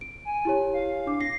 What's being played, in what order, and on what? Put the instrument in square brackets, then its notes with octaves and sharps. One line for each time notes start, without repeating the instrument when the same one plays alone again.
[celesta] D7
[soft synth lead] G#5
[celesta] E4 G4 C#5
[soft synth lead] F5
[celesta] D4 D6
[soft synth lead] A#6 [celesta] C7